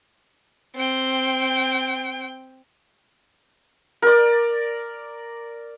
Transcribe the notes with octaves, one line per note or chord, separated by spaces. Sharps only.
C4 G5
A#4 D5